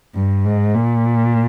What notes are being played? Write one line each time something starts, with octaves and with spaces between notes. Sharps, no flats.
G2
G#2
A#2